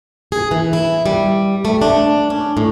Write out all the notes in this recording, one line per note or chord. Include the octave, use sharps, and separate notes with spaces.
G#4
E3
E4
G3
A3
D4
C#4
A2